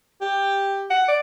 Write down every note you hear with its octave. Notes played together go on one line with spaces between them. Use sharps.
G4
F#5
D5